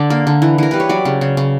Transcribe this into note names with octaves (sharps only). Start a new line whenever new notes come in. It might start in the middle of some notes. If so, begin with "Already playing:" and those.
Already playing: D3 D5
A#3
D3
E3
E3 A#4
G3 B4
C#5
F#3 D5
C#3
C#3
C#3